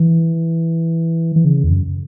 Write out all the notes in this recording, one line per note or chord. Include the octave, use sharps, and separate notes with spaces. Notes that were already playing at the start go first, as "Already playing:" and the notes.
Already playing: E3
E3
C#3
E2
F#2